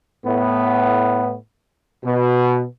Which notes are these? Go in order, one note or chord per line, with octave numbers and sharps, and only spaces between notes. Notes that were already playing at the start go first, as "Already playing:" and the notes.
A2 B3
B2